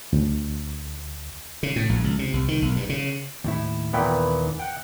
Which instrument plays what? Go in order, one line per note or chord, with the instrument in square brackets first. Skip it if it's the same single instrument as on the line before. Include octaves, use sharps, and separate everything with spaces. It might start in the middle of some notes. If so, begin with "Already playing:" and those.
[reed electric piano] D2
[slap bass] C#3
A2
A#1
C#2
C3
C2
D#3
B1
G2
C#3
[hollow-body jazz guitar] D#2 A2 E4
[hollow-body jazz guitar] D#2 B4 G5 [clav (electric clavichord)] A#2 E3 B3
[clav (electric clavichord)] F#5 G5